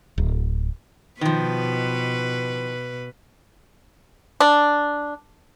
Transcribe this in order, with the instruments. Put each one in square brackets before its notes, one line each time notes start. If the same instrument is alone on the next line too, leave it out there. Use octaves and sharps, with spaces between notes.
[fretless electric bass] D1
[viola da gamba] B2 B4 [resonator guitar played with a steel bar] D#3 F3
[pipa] D4